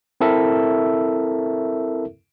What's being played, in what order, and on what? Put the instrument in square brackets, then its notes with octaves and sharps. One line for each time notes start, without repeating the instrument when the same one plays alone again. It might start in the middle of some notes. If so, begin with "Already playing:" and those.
[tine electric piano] C4 E4 A4 A#4 E5